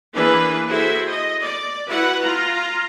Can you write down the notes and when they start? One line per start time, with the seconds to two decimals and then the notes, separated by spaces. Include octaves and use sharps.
0.14 E3 A#3 D4 G#4 B4
0.66 E4 F#4 G#4 A4 C5 E5
1.07 D#5
1.40 D5
1.88 E4 F#4 B4 F#5
2.21 F4 A#5